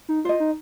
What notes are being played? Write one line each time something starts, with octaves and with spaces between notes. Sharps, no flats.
D#4
F4 C5 D#5
D#4